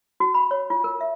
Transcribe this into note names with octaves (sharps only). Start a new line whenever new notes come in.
F#4
B5
C#5
F4
A#4
E5